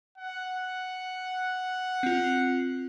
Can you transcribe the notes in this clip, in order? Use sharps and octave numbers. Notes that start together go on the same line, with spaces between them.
F#5
C4 F4